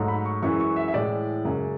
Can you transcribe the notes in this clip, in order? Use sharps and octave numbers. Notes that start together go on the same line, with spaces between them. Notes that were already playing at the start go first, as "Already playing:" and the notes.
Already playing: G#2 F#3 A3
B5
C#6
F#2 E3 G#3 C#6
C#6
E5
E5
A2 E3 G#3 D5
F#2 C#3 G#3